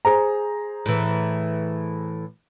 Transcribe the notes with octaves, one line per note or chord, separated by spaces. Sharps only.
G#4 C5 A#5
A2 E3